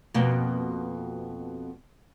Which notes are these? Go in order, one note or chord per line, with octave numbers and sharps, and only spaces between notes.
F2 B2 A#3